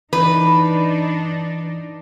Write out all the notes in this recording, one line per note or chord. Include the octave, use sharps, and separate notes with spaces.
E3 D4 D#4 B4